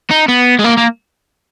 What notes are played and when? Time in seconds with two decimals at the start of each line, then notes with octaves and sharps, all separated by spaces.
0.10 D#4
0.28 B3
0.59 G#3
0.64 A#3
0.77 A#3